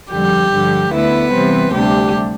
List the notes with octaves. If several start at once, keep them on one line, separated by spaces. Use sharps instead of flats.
F2 D3 G3 G4
G2 D3 F3
D2 D3 A3 B3 E4 B4
C3 E3 G3 C4
D2 C3 G3 D4 G4